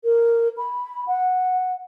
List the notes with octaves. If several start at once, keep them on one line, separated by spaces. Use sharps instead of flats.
A#4
B5
F#5